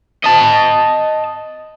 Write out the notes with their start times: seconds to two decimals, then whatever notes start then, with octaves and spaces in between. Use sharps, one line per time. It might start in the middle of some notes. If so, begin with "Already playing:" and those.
0.24 D#5 A5